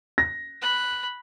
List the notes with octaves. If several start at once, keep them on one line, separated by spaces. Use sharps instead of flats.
A#6
B5 F#6